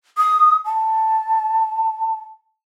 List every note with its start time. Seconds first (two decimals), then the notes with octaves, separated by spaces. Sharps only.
0.17 D#6
0.65 A5